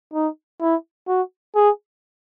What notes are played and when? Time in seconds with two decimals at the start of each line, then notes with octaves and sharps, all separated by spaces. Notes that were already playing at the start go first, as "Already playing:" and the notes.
0.14 D#4
0.61 E4
1.08 F#4
1.55 G#4